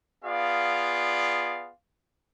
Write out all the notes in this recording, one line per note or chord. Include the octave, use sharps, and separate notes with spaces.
B3 F4 G#4 D5 F5